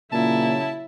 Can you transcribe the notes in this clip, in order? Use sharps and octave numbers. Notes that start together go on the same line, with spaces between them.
A#2 C#3 F#3 E4 A5